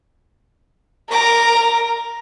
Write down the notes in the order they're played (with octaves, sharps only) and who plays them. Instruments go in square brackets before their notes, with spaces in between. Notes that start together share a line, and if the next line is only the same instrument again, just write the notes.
[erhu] A#4 [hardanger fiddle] A#5 D6